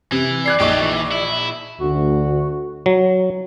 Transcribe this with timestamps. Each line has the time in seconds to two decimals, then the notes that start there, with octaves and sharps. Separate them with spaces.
0.12 C3 E3
0.46 D5 F#6 G#6 C7
0.60 A#1 D#4 G4 A4 C#6
0.82 E3
1.12 E4
1.80 D2 F#4
2.86 F#3